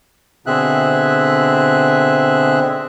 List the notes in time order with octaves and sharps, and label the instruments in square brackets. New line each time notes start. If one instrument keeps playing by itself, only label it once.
[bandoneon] B2 D3 C4 G#4 E5 F#6